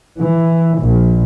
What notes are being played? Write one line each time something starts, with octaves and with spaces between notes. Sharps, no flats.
E3
A#1